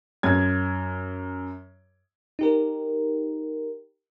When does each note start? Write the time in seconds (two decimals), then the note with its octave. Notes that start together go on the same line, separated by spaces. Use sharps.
0.23 F#2 G#6
2.39 D#4 G4 A#4